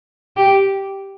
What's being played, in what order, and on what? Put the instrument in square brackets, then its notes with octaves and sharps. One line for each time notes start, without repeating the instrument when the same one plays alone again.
[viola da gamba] G4